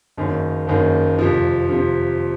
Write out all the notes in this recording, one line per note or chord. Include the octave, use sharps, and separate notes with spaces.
F#1 F#2 D#3 A#3 C#4
F#1 F#2 D#3 A#3 C#4
F2 C3 F3
C3 F3